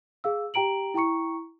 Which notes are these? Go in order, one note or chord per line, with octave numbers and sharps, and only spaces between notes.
G#4 F5 E6
G4 G5 A#5 D7 F#7
E4 G5 A#5 C#6 C#7